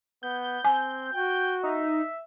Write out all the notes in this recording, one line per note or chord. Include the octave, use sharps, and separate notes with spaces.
B3 G6
C4 G#5
F#4 G5
D#4 E5